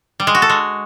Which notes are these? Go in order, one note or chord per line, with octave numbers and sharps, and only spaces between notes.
G3
G#3
F#4
A4
G#3